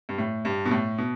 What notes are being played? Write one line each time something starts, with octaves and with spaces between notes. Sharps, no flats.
G2
A2
G2
B2
A2
B2